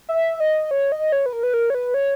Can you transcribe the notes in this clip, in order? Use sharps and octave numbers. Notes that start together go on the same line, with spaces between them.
E5
D#5
C#5
D#5
C#5
B4
A#4
B4
A#4
C#5
B4
C#5